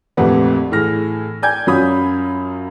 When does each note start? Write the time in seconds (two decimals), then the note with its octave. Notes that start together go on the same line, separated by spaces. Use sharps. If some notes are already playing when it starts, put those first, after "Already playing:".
0.17 A#1 F2 A3 G4 B4 F#5
0.72 A2 E3 G#4 F6 A#6
1.42 D5 G5 G#5 G6 G#6
1.67 F#2 F#3 F4 B5 D#6